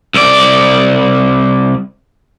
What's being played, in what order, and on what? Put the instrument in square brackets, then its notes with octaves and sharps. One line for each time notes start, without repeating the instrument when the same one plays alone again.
[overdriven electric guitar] C2 D5